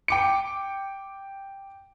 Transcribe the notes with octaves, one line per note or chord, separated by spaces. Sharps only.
G5 D6 C#7